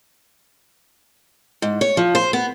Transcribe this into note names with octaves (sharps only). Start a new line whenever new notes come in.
G#2
C#5
F3
C5
B3